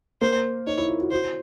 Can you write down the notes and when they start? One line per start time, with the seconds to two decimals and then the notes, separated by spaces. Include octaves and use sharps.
0.21 A#3 C5
0.67 D#4 C#5
0.78 E4
0.88 F4
1.00 F#4
1.11 F#4 C5